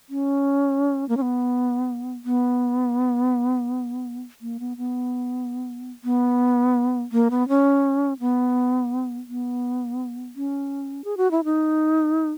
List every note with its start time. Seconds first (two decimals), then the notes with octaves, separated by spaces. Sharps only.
0.09 C#4
1.09 A#3
1.17 C#4
1.22 B3
2.25 B3
4.41 A#3
4.60 B3
4.77 B3
6.04 B3
7.12 A#3
7.31 B3
7.49 C#4
8.20 B3
9.28 B3
10.36 C#4
11.04 G#4
11.17 F#4
11.31 E4
11.44 D#4